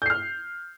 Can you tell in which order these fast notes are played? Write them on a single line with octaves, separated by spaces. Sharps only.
G6 C7 F6